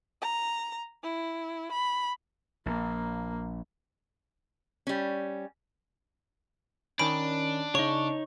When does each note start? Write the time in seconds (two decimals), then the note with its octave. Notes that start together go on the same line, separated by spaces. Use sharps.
0.21 A#5
1.03 E4
1.72 B5
2.66 A#1 A#3
4.87 G3 C#4
6.99 D#3 C#4 D4 B5 D7
7.75 C#3 D#4 C#5 C#6